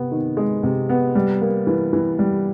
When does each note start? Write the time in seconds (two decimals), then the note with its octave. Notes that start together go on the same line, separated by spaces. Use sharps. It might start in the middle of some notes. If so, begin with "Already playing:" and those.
Already playing: C3 B3
0.11 D#3
0.37 G#3
0.63 C3
0.89 B3
1.15 G3
1.41 A#3
1.67 E3
1.93 E3
2.19 G3